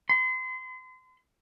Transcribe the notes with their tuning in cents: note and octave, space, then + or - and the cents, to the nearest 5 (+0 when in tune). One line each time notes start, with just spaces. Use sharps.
C6 -35